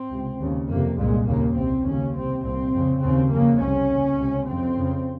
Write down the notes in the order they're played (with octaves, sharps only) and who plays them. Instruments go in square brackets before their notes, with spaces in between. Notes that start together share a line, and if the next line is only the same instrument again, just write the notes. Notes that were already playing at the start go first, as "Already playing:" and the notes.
Already playing: [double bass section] C4
C#2 C3
D#2 C#3
F2 C3 A#3
C2 A#2 G#3
D#2 C#3 A#3
C2 C3 C4
D#2 C#3 C#4
C2 C3 C4
C2 A#2 C4
F2 C#3
D#2 C#3 C4
F2 C#3 A#3
C2 C3 C#4
D#2 C#3
C#2 C3
F2 C#3 C4
F2 C#3